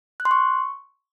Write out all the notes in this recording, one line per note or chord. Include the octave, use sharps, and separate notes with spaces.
F#6
C6
C#6